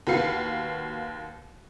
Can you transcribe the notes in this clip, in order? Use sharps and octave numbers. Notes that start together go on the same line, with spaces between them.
D#2 F#4 B4 F5 C7